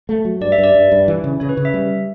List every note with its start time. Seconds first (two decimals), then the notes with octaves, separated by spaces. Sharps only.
0.09 A3
0.25 F#3
0.41 G2 D5
0.52 E5
0.58 G2
0.64 D5
0.74 G2
0.92 G2
1.08 E3
1.24 C#3
1.40 C#3 C#5
1.49 B4
1.57 C#3
1.65 E5
1.74 G3